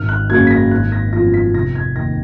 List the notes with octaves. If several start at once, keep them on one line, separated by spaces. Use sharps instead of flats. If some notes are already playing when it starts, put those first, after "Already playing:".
Already playing: G#1 F6
F#6
F#2 C#3 F#3 A#3 G#6
B6
A#6
G#1 F#6
A#6
F#2 F3 B3 F4 A#6
B6
F1 A#6
G#6
D#2 D#3 A#6